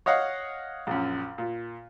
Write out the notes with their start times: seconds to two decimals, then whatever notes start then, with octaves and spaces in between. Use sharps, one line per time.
0.06 C#5 D#5 F5 F#5
0.87 A#1 F#2
1.38 A#2